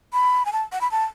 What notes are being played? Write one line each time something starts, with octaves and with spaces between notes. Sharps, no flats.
B5
G#5
A5
F#5
B5
A5